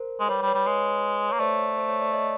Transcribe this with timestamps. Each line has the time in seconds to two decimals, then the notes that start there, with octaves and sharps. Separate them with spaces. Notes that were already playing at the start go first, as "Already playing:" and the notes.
Already playing: A#4 C5
0.20 G#3
0.29 G3 B4 C#5
0.42 G3
0.47 B4 C#5
0.54 G3
0.66 G#3 B4 C#5
1.29 A#3 C#5
1.39 A3 C5 D5
1.77 C5
1.89 C#5
2.01 D5
2.13 C#5 D#5